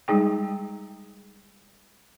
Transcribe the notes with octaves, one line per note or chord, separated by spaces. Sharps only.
G3 G#3 D#4 G#4 G5